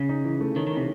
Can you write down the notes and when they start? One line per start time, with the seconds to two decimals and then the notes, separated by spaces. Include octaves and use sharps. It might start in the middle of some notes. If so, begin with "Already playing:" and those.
Already playing: C#3
0.09 D#4
0.24 E3
0.41 A3
0.56 D#3 C#4
0.67 D#3 E3
0.77 C3